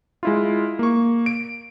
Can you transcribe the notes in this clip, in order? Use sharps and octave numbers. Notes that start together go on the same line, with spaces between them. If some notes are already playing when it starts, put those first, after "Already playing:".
G#3 E4 F4
A#3 C#6
D7